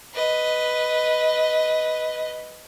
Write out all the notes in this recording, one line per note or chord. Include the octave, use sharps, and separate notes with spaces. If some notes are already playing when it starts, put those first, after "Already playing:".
B4 D#5